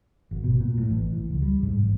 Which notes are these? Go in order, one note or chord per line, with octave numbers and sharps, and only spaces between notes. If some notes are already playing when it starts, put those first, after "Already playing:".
G#1
B2
A#2
A2
A1
E3
C#2
G3
G#2
A1